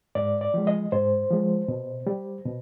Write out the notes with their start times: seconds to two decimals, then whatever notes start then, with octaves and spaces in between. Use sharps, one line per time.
0.15 G#2 D5
0.41 D5
0.54 F3 G#3
0.67 D#5
0.92 G#2 C5
1.30 F3 G#3
1.68 B2
2.07 G3
2.45 B2